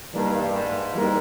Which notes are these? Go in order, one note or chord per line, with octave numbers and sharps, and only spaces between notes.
G2 E3 G3 A#3 D#4 A#4
G#2
E3 G3 A#3 D#4 A#4